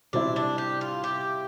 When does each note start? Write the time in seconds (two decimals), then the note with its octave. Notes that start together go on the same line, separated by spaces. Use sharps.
0.13 C3 G3 C4 D4 E4
0.36 D4
0.58 G4
0.81 F4
1.04 G4